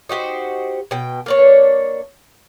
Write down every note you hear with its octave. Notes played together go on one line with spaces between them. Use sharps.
D#4 F#4 G4 C5
B2 G5
A#3 D4 C#5